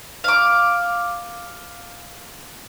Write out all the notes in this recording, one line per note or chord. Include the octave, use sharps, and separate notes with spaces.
F5 D6